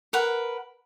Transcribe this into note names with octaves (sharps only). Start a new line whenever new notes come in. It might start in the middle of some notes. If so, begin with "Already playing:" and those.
A#4 B4 F#5